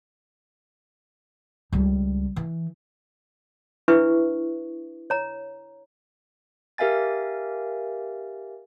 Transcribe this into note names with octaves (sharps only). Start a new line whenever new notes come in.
C#2 G3
E3
D4 E4 B4 E5 C#6
C#5 A#5
G4 A#4 E5 F5 G#5 A6